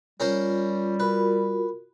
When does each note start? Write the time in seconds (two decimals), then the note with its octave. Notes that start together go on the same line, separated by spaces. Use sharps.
0.20 G3 C#4 F4 A#4 C5
1.00 F4 F#4 A#4 B4